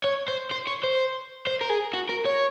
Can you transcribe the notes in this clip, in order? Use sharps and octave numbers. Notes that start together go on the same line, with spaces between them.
C#5
C5
C5
C#5
C5
C5
A#4
G#4
F#4
A#4
C#5